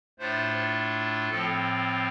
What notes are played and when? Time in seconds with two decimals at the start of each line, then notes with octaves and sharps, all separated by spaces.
0.19 A2 A3 D4 F4 C5
1.30 A2 F3 C4 A4